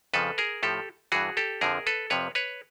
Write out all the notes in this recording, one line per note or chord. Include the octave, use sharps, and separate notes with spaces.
F2 C#3 F3 A4 B4
G#4 A#4
A2 F3 G4 A4
G2 E3 F#4 G#4
G4 A4
F2 D3 F3 G#4 A#4
A4 B4
F2 C3 F3 B4 C#5
B4 C#5